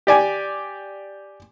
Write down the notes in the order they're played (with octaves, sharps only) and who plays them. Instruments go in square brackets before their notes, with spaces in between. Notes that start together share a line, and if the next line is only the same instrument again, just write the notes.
[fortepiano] G4 D5 G#5